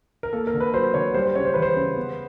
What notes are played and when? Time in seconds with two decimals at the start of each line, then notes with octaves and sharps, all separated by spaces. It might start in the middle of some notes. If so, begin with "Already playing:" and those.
0.23 A#4
0.33 A#3 A4
0.47 A#4
0.54 D3
0.60 B4
0.74 F#3 C5
0.94 D3 C#5
1.14 G3 C5
1.25 C5
1.35 C#3 C#5
1.45 C5
1.54 E3 B4
1.62 C5
1.76 C#3
1.97 B3